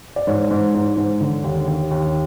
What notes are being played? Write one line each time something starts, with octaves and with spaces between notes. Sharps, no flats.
D5
G#2 C#5
G#2
G#2
G#2
D3
D#2
D#2
D#2